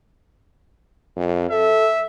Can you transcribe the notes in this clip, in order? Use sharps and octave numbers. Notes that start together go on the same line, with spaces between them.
F2
A4 E5